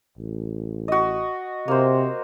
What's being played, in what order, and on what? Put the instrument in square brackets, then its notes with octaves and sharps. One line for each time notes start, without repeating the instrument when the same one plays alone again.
[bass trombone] A1
[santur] F#4 D#5
[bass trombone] C3 [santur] A#3 C5